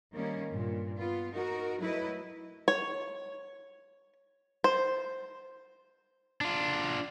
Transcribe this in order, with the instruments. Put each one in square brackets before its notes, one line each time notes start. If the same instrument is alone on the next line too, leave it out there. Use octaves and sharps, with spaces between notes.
[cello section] D#3 G3 A#3 C#4
G2 A#2
B3 F4
D#4 F#4 A#4
F#3 A3 E4 B4 D#5
[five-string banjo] C#5
C5
[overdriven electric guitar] D4 F4